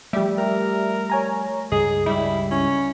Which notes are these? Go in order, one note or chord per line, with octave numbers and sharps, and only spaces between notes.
F3 G3 A3 G4 D5 E5
A#4
C#5 G#5 A#5
C#2 G2 G#4 D#5
G3 E4
C#4 E4